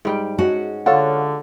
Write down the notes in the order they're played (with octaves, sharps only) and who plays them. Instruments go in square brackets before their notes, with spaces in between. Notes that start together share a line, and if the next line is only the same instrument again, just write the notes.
[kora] G#2 G3 G5
[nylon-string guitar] G#3 C#4 F#4 [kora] F#5
[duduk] D3 [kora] F4 A4 [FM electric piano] C#5 F5 F#5